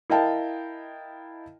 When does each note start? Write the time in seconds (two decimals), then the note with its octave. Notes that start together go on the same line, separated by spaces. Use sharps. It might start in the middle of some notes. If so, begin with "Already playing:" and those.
0.10 E4 A#4 D#5 F5 G5 A5